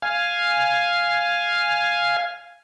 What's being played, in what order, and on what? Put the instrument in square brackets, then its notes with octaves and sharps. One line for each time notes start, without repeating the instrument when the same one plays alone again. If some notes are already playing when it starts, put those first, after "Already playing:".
[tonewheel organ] F5 G#5